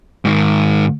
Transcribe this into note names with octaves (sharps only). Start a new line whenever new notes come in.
G#2 D#3